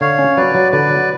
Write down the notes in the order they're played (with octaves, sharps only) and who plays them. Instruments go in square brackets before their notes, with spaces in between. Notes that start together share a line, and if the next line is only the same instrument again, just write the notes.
[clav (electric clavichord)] D3 [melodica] C#5 F5
[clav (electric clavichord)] C#4
[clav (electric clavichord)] F#3 [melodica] B4 D5
[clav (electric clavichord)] F#3
[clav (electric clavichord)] D3 [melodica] B4 D5
[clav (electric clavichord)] F#3